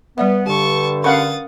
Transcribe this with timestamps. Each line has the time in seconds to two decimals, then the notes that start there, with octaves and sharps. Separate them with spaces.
0.18 G3 B3 D5 E5
0.47 G2 D3 A5 C#6
1.04 C#4 A#4 F5 F#5 B5 C#6 D#6 A6